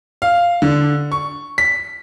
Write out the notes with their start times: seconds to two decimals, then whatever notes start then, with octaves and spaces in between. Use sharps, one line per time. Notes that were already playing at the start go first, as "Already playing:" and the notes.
0.22 F5
0.62 D3
1.12 C#6
1.58 B6